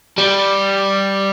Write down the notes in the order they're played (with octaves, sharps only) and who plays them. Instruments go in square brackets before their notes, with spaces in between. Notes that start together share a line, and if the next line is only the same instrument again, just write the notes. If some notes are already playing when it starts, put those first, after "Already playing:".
[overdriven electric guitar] G3